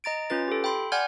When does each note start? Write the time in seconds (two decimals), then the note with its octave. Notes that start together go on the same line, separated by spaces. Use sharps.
0.04 D#5 A#5 A6 D7
0.30 C#4 F4 B4 A6
0.48 G4 A4
0.64 G5 B5 C6
0.92 D5 F#5 G#5 F6 G6 G#6